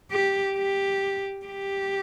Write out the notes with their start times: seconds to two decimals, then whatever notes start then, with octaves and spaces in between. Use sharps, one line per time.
0.11 G4
0.57 G4
1.46 G4